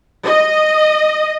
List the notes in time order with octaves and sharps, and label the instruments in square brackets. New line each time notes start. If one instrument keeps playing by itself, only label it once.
[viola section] D#5